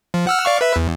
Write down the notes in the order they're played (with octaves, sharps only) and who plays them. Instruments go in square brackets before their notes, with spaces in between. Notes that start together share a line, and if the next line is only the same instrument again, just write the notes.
[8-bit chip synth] F3
F#5 E6 F6
D5 F5 C#6
B4 E5
E2